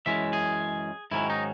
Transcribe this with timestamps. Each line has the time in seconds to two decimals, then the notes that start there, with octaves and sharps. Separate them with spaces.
0.06 F#2 E3 G#3 C#4 E5
0.33 G#4
1.11 G#2 D#3 F#3 C#4 E4
1.30 D#4